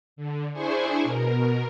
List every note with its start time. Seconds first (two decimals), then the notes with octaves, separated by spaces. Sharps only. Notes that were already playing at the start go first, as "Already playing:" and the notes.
0.16 D3
0.53 D4 E4 G#4 C5 G#5 C#6
1.04 B2 A#4